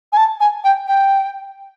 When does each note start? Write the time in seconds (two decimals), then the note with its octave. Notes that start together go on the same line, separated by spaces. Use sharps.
0.12 G#5
0.17 A5
0.40 G#5
0.64 G5
0.87 G5